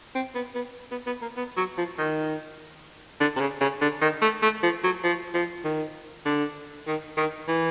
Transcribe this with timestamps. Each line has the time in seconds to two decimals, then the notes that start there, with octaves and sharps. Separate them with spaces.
0.15 C4
0.35 B3
0.55 B3
0.91 B3
1.07 B3
1.22 A#3
1.37 B3
1.57 F#3
1.78 F3
1.98 D#3
3.20 D3
3.36 C3
3.40 C#3
3.61 C#3
3.81 D3
4.02 D#3
4.22 A3
4.42 A3
4.63 F3
4.84 F#3
5.04 F3
5.34 F3
5.64 D#3
6.26 D3
6.87 D#3
7.17 D#3
7.48 E3